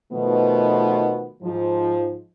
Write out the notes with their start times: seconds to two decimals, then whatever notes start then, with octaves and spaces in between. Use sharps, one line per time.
0.11 B2 D#3 F3 A3 B3
1.41 G#2 F3